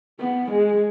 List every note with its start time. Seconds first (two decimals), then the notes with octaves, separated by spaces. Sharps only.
0.19 B3
0.51 G#3